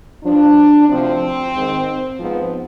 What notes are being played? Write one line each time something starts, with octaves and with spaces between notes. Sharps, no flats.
G2 F3 D4
D2 C3 F3 C4
G#2 D#3
G#2 F3 B3